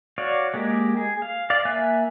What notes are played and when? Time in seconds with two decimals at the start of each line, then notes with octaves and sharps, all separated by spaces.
0.18 F#4 C#5 D5 F5
0.54 G#3 A#3 G4
0.97 G#4
1.22 F5
1.50 D5 F5
1.65 A#3 E5 G#5 F#6